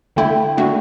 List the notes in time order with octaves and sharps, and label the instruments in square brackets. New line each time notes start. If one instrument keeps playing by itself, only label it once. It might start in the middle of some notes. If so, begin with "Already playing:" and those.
[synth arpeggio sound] D3 A3 E4 [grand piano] G5
[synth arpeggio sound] D3 A3 D4 F#4